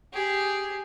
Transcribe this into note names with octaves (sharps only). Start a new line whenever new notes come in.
G4 G#4